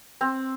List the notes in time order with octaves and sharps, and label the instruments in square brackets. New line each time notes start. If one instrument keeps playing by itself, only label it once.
[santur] C4